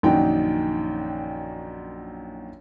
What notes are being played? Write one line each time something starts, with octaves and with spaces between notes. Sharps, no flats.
A#1 F#2 D#3 D#4 F#4 G5